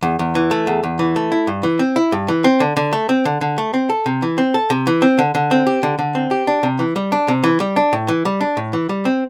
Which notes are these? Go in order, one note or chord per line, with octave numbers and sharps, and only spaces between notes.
E2
E2
E3
A3
E2
E2
E3
A3
E4
G2
E3
C4
E4
G2
E3
C4
D3
D3
A3
C4
D3
D3
A3
C4
A4
C3
E3
C4
A4
C3
E3
C4
D3
D3
C4
G4
D3
D3
C4
G4
D4
C3
E3
G3
D4
C3
E3
G3
D4
A2
E3
G3
D4
A2
E3
G3
C4